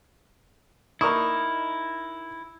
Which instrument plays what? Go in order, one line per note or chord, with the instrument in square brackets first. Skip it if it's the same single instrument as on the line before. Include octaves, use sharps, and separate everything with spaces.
[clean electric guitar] D#4 E4 [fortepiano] A#4 C#6 D#6